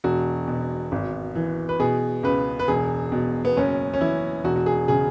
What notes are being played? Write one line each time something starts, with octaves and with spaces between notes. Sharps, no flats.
E1 F#4
B2
G#1
E3
B4
B2 G#4
C#2 B4
B4
E1 G#4
B2
B3
F#1 C#4
C#4
E3 E4
E1 F#4
F#4
G#4
C#3 G#4